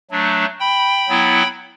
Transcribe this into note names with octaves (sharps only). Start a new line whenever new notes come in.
F#3 A3 D4
G5 B5
F#3 B3 E4